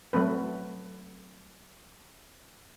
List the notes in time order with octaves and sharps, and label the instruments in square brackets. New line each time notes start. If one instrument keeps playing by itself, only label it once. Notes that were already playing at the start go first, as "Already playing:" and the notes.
[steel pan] F#3 A3 C4 B4